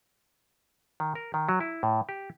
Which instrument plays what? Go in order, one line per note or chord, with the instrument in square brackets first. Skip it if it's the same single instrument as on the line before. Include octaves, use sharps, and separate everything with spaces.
[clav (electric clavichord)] D#3
A#4
D#3
F#3
E4
A2
G4